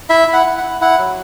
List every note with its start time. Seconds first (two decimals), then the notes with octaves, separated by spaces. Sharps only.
0.09 E4 E5
0.28 E4
0.33 F#5
0.46 E4
0.58 F#5
0.63 E4
0.81 E4 F#5
0.98 F#3